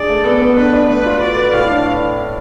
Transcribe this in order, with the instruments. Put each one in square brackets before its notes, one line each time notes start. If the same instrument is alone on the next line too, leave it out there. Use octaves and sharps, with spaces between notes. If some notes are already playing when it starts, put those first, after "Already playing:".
Already playing: [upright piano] D4 G#4 [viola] D5
[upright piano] A3
[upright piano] B3 [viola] A4
[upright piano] B3
[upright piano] D4 [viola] B4
[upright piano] D4
[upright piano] A3 [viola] B4
[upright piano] F4
[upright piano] F#4 [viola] D5
[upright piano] B4
[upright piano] A2 [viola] F5
[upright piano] D4